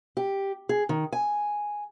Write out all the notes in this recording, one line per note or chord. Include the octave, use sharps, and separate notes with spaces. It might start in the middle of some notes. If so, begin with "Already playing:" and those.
G4
G#4
D#3
G#5